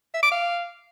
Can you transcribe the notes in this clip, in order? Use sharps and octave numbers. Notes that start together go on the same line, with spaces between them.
E5
D6
F5